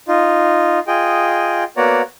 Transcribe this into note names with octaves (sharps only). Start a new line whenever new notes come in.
D#4 F4
F4 G#4 D#5 G5
A#3 B3 F#4 C#5 D5 A#5